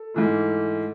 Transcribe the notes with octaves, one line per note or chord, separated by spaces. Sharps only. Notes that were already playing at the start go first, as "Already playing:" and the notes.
Already playing: A4
G#2 E3 A3